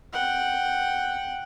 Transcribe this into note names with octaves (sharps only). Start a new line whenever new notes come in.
F#5 G5